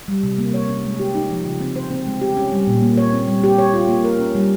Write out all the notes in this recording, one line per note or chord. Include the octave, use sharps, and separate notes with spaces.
G3
C3
A#3
C#5
C#4
G#3
G4
D#4
F3
C#3
C4
C5
C4
G#3
G4
C#4
G3
A#2
A#3
C#5
C4
G3
G4
C#5
F4
A#3
A#4
C#4
G3